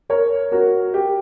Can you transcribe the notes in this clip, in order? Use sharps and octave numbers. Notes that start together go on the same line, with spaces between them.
A#4 C#5
F#4 A#4
G4